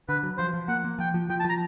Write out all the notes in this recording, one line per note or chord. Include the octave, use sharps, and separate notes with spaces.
D3 B4
F#3
F3 C5
F3
A#3 F#5
A#3
F3 G5
F3
F3 G5
A5
F3 A#5